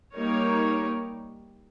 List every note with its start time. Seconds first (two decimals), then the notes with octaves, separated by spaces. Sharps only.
0.15 G3 A#3 D#4 A#4 C#5